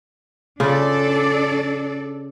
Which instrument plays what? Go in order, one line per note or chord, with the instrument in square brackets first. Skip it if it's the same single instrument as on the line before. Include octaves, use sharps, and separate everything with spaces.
[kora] C#3 F4 [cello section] D4 A4 D5